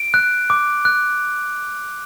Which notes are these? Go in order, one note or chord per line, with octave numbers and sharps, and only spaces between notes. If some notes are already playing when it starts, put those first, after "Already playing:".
Already playing: D7
F#6
D6
F#6